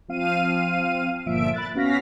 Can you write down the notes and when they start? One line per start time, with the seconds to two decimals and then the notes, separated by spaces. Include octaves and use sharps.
0.08 F3 C4 F5 D#7
1.26 G1 A#2 F3 E5 D7
1.54 B5 F#6 A6
1.75 B3 C#4 F#4 F5 A#6 B6